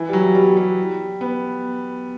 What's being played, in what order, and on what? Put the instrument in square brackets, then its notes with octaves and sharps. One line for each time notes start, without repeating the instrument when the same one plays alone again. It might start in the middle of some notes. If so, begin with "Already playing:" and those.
Already playing: [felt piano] E3
G3
F#3
G3
G3
B3